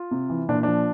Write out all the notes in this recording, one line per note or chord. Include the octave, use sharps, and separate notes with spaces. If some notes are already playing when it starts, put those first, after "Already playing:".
Already playing: F4
C3
E3
A#2 D4
F3 D4